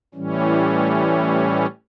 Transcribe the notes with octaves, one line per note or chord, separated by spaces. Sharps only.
A2 E3 G3 C#4